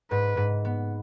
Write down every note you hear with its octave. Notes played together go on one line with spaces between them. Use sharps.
G#2 B4
G#2
B3